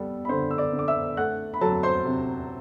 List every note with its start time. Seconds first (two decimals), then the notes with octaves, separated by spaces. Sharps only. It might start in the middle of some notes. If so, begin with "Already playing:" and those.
Already playing: G3 B3 A4
0.25 B5
0.29 D3 C5 C6
0.51 E6
0.58 D5 D6
0.73 D3
0.79 D6
0.88 E5 E6
1.17 A3 F#5 F#6
1.54 B5
1.61 F#3 A4 A5
1.83 C5 C6
2.05 C3